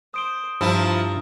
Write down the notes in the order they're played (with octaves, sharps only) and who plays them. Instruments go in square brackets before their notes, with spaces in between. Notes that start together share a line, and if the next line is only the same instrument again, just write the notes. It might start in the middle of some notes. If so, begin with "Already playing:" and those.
[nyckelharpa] C5 [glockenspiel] D#6 D7 G7
[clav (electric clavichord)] G2 A5 [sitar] F3 E4 [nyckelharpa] F4 A#5 [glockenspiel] E6